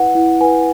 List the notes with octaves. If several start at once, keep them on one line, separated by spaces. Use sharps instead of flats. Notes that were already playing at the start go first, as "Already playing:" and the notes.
Already playing: E4 B4 F#5
E4
B4 G#5